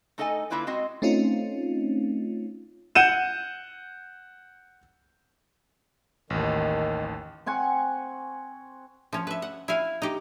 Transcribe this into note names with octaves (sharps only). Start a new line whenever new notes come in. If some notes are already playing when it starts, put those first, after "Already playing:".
A3 D#4 A4 D#5 F5 G#5
D3 A#3 E4 F4 B4 D5
G#3 C4 F#4 D#5
A3 C4 C#4 D#4 F4
F#5 G6 D#7 E7
A1 D#2 D#3
C4 F#5 G#5 C#6
F3 C#4
B4 E5
F#5
E4 E5 F5 G#5
D#4 G4